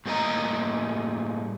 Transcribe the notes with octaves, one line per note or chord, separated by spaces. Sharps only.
A2 G3 A#3 C#4 D#5 A#5